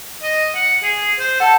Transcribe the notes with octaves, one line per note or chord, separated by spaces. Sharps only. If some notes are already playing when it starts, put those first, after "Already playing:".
D#5
F#5
G#4
C5
A4 F#5 A5